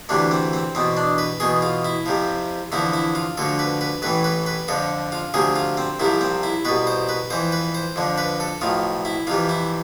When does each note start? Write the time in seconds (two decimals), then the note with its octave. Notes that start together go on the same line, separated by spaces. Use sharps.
0.09 D2 C3 E3 D4
0.31 C4
0.53 C4
0.75 E2 B2 C4
0.97 D4
1.18 B4
1.40 E2 B2 G#4
1.62 F4
1.85 E4
2.06 F2 C3 F3
2.72 E2 D3 F3 E4
2.93 E4
3.15 F4
3.37 D2 D3 F3 A4
3.59 B4
3.81 B4
4.02 A1 A2 E3 B4
4.24 B4
4.46 B4
4.68 F2 D3 F3 A4
5.12 F4
5.34 D2 C3 F3 G#4
5.56 F4
5.77 C4
6.00 C2 C3 F3 E4
6.21 C4
6.43 E4
6.65 C2 B2 B4
6.87 C5
7.09 B4
7.30 F2 E3 C5
7.52 B4
7.74 C5
7.96 F2 D3 F3
8.18 B4
8.40 A4
8.61 B1 A2 F3 F4
9.05 E4
9.27 F2 C3 E3 F4
9.49 E4